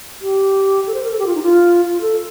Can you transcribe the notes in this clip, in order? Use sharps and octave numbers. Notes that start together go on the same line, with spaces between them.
G4
A4
C5
A#4
A4
G4
F4
D#4
F4
F4
A4